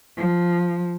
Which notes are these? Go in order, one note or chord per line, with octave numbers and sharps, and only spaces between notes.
F3